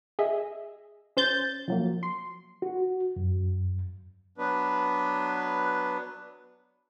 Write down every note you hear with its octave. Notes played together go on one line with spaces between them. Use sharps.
G#4 D#5 E5
C#4 C5 G6 A6
F3 F#3 A#3
C6
F#4
F#2
F#3 B3 D4 B4